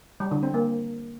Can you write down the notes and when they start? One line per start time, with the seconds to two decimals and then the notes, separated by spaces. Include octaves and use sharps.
0.20 G3
0.31 D3
0.43 C4
0.54 A#3